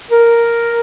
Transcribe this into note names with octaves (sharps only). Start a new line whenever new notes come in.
A#4